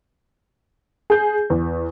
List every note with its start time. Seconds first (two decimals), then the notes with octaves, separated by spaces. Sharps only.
1.10 G#4 G6
1.50 E2